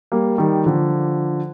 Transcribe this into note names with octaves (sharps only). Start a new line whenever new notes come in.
G3 A#3
D#3 G3
D3 F3